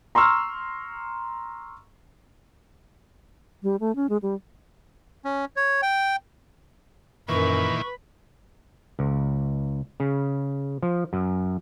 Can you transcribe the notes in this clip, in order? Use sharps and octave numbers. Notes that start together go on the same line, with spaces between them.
A#5 C6 C#6 E6 F6
G3
A3
C#4
G#3
G3
C#4
C#5
G5
F#2 A#2 D#3 E3 B4 C#6
C#2
C#3
F3
F#2